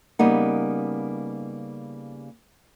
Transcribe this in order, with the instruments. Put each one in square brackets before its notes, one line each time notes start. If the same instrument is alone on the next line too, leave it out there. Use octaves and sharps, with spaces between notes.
[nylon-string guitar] C#3 G3 A#3 B3 D#4